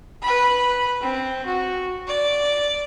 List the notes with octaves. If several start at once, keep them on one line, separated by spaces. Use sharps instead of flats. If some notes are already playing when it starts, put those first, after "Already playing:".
B4 B5
C4
F#4
D5